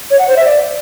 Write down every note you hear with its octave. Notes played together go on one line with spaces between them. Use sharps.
C#5
F#5
C5
E5
D5